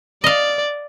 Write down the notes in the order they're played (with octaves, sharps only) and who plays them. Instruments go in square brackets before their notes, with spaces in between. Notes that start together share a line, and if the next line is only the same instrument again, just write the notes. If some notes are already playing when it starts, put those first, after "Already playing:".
[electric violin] D5 [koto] D#5 F5